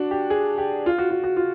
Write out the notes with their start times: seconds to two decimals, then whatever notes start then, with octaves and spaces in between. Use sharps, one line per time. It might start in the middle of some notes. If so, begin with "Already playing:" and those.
Already playing: D4 F#4
0.11 G4
0.30 G#4
0.58 G4
0.86 F4
0.98 F#4
1.11 F4
1.24 F#4
1.36 F4